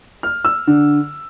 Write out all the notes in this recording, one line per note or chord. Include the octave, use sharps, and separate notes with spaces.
F6
E6
D3